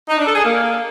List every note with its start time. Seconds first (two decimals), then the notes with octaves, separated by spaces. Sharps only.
0.09 D#4
0.17 D4
0.26 A4
0.35 G#4
0.43 A#3